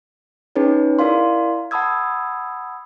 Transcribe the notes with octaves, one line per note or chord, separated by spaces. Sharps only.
C#4 D#4 G#4 B4 C#5
E4 A#4 D5 F5 C6
F#5 A5 B5 D#6 E6 G#6